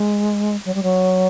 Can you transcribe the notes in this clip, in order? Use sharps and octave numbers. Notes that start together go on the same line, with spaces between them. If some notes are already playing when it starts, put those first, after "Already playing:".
Already playing: G#3
F#3
G3
F#3